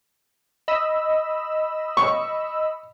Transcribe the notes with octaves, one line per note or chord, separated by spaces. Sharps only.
D#5 B5 E6
C#6